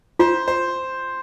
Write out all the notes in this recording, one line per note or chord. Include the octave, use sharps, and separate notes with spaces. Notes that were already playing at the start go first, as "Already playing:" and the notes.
F4 C5
C5